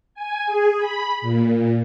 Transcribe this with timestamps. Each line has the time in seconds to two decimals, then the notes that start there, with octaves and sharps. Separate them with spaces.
0.15 G#5
0.46 G#4
0.78 B5
1.22 A#2